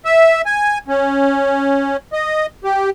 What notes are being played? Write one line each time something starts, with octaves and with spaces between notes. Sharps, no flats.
E5
G#5
C#4
D#5
G4